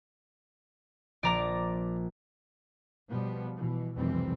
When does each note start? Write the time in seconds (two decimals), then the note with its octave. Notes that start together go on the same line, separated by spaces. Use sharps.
1.23 A#1 D5 A#5 D6
3.09 B2 F3 G3 B3
3.57 B2 E3
3.95 F1 C2 B2 E3 G3 C4